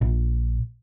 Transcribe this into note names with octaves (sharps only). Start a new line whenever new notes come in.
A#1